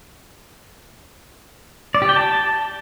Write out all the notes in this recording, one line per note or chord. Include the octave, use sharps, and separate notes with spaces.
D5
G4
G5
A5